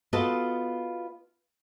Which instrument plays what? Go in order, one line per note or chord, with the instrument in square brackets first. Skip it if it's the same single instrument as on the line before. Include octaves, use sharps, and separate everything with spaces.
[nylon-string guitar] B3 F4 F#4 A4 D#5 A5